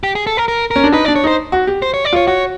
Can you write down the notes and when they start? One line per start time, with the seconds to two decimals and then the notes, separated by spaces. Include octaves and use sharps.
0.03 G4
0.15 G#4
0.27 A4
0.37 A#4
0.48 A#4
0.71 C#4 A#4
0.84 D4
0.93 D#4 B4
1.05 D5
1.08 D4
1.16 C#5
1.24 D#4 C5
1.52 F#4
1.67 G4
1.82 C5
1.94 C#5
2.05 D5
2.13 F4 C#5
2.27 F#4 C#5